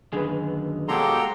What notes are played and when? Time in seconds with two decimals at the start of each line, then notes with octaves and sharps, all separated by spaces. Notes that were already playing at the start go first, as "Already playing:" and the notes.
0.13 F#2 D3 D#3 G#4 B4
0.88 B2 F#3 G#3 A#3 G4 A4 A#5 C6